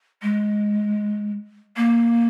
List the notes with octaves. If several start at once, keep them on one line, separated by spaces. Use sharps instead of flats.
G#3
A#3